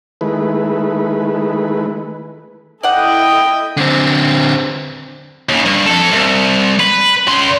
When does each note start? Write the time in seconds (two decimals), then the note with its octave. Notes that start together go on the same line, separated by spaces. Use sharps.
0.21 D#3 G#3 A3 E4 B4
2.83 E4 A4 D5 D#5 F#5 G5
3.77 D3 C4
5.49 D#2 C#3
5.65 G2
5.86 F2 A4
6.11 C2
6.79 B4
7.27 C#3 C6